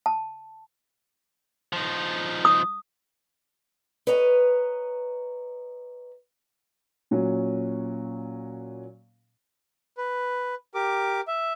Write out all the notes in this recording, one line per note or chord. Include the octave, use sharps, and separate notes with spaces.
A5
F3 D#4
D#6
B4 C#5 D#5 A#5
A#2 F#3 C#4
B4
G4 A#4 D6
E5